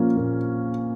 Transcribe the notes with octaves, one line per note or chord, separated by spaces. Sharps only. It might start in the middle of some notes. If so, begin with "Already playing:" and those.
Already playing: A#2 F3 A#3 C#4
A#2